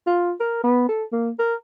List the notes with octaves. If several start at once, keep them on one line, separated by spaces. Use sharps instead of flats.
F4
A#4
B3
A4
A#3
A#4